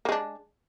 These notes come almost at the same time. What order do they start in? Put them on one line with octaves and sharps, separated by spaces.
A#3 G#3 D4